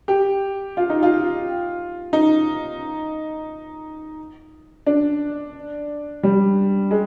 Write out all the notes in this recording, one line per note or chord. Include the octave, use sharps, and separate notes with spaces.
G4
F4
D#4
F4
D#4
D4
G3
G#3